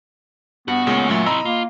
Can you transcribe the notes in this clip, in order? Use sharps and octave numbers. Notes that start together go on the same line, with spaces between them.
G2 B3 F#4
A#2 C#3 G#3 A3 C#5
F#2 A#2 F#3 A3
C4 E4 D#5 A#5 B5 E6
A#3 F4